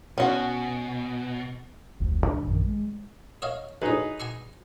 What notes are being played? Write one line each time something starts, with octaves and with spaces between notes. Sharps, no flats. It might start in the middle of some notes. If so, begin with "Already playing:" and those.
B2 C#4 F#4
F1 D2
G#2 C#3 E3 D4
A#1 F#2 D#3
G#3
C#5 D#5 F5
D2 A2 D#4 G#4 B4
G#5 C6 C#6